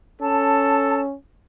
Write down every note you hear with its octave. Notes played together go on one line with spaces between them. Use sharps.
C#4 A4 A5